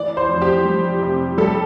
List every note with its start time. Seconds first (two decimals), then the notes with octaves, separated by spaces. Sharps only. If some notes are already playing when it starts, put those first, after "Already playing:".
Already playing: E3 D5
0.17 C5
0.29 F2
0.42 G4
0.65 G3
1.02 C3
1.38 G3 A4